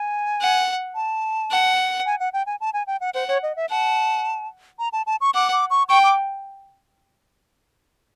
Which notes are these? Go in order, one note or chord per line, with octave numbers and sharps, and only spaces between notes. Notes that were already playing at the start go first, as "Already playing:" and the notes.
Already playing: G#5
F#5
A5
F#5
G#5
F#5
G5
G#5
A5
G#5
G5
F#5
C5 F#5
C#5
D#5
E5
F#5 A5
A#5
A5
A5
C#6
F#5 D6
D6
C#6
G5 C#6
D6